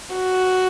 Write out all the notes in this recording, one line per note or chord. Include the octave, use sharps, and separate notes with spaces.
F#4